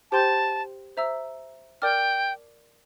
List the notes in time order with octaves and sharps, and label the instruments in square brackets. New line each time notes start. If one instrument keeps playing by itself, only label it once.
[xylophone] G4 C5 G5 C6 G6 [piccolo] A5
[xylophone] C5 E5 A#5 E6
[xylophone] A#4 D5 A5 D6 F6 [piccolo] G5